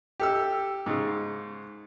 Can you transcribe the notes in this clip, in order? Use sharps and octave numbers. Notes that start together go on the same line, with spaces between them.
G4 A4 E6
G#2 C#3